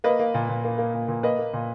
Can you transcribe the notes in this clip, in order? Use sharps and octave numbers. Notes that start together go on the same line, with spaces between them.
A#3 B4 D#5
A#3
A#2
A#2
A#3
A#3
A#2
A#2
A#3 B4 D#5
A#3
A#2